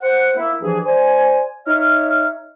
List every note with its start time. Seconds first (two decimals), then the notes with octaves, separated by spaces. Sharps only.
0.01 C5 F#5
0.36 A#3 E4
0.62 G2 E3 F3 G#4
0.85 C5 D5 G#5
1.67 D#4 C#5 E5 F6